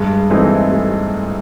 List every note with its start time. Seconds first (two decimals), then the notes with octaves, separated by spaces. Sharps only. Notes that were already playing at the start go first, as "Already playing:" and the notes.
Already playing: G2 G#3
0.30 E3 G#3 A3 C4 D#4
0.72 A3